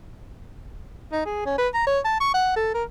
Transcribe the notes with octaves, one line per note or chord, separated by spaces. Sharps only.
D#4
G#4
C#4
B4
A#5
C#5
A5
C#6
F#5
A4
A#4